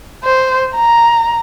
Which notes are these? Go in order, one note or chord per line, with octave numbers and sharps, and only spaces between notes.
C5
A#5